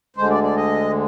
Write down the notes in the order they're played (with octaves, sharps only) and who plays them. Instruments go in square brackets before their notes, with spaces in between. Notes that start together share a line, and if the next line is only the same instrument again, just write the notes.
[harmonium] D2 D3 G#3 C5
D5
D5
D#5